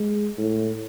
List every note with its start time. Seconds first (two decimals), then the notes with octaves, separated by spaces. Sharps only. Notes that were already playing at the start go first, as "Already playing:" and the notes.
Already playing: G#3
0.38 A2